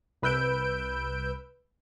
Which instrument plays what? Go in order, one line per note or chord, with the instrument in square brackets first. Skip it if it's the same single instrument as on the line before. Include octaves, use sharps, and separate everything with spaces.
[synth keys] C2 B4 E6 G6 D7